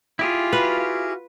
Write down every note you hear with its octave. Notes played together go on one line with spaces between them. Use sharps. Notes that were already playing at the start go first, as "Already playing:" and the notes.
E4 F4 G4 G#4
F#4 B4 F5